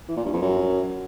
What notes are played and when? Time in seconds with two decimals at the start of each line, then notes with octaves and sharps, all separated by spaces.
0.08 E3
0.17 A#2
0.25 G2
0.33 F2
0.41 F#2